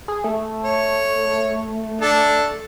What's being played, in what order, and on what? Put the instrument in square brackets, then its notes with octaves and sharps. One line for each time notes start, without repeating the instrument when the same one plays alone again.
[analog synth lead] G#4
A3
[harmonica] C#5
D4 A4